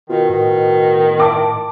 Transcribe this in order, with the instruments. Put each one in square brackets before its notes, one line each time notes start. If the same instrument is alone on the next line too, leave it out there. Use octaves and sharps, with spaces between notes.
[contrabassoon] B2 [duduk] D#3 [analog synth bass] F4
[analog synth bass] A2 [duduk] D#3
[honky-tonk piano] A5 D6